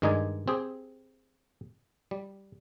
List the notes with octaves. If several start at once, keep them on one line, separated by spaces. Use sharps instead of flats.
G2 D#3 G#3 D#4 D5 G#5
C4 G4 G#4
G3